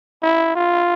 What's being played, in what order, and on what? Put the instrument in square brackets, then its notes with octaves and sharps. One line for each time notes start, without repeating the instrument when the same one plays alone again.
[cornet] E4
F4